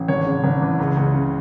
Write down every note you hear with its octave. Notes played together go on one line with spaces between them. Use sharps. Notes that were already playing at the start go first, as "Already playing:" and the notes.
Already playing: A1
G#1 C#5
C#3
G#1
E3
C#2
C#2
C#3